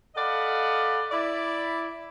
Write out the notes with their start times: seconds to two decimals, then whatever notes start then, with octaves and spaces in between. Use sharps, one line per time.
0.16 A4 D5 D#5 F5 F#5 B5
1.11 E4 D5 B5